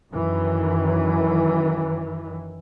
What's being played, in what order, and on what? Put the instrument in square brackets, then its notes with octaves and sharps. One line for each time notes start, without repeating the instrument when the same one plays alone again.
[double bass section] F#2 D#3 E3